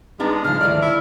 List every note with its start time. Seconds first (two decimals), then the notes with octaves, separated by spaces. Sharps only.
0.20 G#3 B3 D4 D#4
0.44 C#3 F3 F6
0.61 D2 D#3 D5
0.82 E4